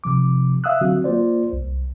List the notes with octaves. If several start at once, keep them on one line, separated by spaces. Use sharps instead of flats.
C3 F3 D6
E5 F5 D#6 E6 F#6
D3 F#3 C4 F#4
A#3 F4 C5 D5
C2